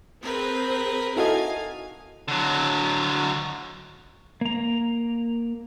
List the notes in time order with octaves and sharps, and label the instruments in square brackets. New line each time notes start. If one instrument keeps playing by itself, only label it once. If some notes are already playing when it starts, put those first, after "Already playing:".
[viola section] C4 G#4 [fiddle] A#4 B4
[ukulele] D#4 A4 A#4 [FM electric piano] E4 F#4 D#5 [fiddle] F5 G#5
[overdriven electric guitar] D3 F#3
[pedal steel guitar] A#3 A#5